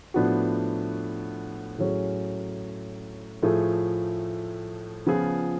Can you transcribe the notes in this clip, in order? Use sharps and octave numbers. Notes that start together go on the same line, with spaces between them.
A2 F3 B3 D4 F#4
A2 F#3 C#4 G#4
A2 F3 A3 F4 G#4
C#3 F3 B3 F4 G#4